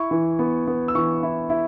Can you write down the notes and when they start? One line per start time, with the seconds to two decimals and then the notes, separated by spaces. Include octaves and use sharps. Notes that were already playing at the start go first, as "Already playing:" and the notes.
Already playing: E4 C#6
0.11 E3
0.39 B3
0.67 B3
0.88 E6
0.95 E3 C#6
1.23 E4
1.50 E4